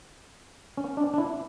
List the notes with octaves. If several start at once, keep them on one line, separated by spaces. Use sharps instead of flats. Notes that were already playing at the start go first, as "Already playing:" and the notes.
C#4
D4
D4
E4